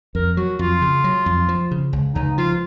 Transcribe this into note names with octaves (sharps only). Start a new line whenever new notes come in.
F2 A#4
F#3 F#4
F2 F4
C#3
F#3
F2
F3
C#3
C#2
C#2 D#4
F3 F4